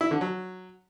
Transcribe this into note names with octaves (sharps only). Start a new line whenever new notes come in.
E4
D3
F#3